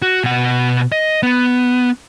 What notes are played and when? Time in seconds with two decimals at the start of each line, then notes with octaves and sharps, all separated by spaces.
0.02 F#4
0.24 B2 F#5
0.92 D#5
1.23 B3